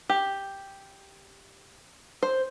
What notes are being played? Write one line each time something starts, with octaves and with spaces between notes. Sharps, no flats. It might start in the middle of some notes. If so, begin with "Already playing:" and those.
G4
C5